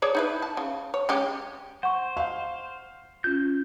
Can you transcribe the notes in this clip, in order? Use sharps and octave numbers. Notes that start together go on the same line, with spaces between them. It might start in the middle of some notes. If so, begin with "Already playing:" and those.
G#4 C#5 D5
D#4 E4 B4
A5
C#3
C#5
G#3 C#4 G4
C5 F#5 C#6
F5
C#4 F4 G6